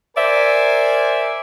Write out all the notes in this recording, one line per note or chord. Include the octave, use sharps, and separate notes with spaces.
A#4 C5 D5 E5 G#5